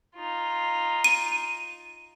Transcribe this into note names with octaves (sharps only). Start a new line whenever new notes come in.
D#4 F4
D#7